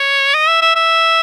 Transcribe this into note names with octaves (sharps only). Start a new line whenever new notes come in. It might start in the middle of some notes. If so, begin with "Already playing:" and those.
Already playing: C#5
D#5
E5
E5
E5